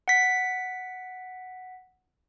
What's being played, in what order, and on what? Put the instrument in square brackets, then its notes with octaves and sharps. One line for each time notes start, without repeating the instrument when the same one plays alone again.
[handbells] F#5 B6